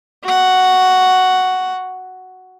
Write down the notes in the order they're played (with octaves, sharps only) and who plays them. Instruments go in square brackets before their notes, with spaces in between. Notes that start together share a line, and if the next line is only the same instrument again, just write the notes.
[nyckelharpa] F#4 F#5